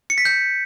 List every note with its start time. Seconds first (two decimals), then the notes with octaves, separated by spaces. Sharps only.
0.10 C#7
0.18 B6
0.25 G6